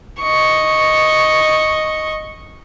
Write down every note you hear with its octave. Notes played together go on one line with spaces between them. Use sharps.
D#5 C#6